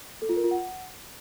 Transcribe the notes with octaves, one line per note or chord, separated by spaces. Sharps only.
A4
F4
A#4
F4
F#5